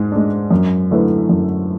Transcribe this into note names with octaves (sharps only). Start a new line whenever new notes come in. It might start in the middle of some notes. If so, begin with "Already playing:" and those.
Already playing: G#2 G#3
G#3 D4
F#2
D3 A3 E4 B4
F#2